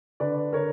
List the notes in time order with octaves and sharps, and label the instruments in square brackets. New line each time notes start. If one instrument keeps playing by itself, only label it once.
[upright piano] D3 B4 D5
D3 A#4 C#5